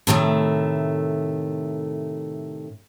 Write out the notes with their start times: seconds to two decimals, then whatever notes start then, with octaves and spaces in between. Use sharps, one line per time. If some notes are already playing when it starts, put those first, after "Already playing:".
0.07 A2 C3 D#3 G3 A3